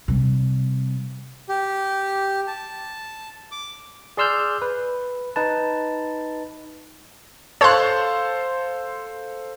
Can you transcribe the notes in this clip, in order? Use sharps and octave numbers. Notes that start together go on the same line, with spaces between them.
C3 G3
G4
A5
D6
G#4 D5 C6 E6 F6 G6
B4
D#4 B4 A5
A4 C5 C#5 F5 A5 C6 F#6